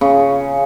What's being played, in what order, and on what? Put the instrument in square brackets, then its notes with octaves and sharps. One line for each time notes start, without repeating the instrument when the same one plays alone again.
[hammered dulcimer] C#3